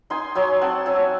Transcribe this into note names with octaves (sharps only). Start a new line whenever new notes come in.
D#4 G#5 C6
F#3 G#5 C6
C4 F#5 A5
F#3 E5 G#5